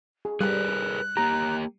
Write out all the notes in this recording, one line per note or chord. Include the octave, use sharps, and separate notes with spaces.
G#4
G3 G#4 A#4 B4 F#6
A#3 G4 A#5